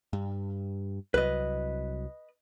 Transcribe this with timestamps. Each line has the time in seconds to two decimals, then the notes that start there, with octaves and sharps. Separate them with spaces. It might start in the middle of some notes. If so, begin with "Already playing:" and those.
0.13 G2
1.14 C2 F#3 B4 D#5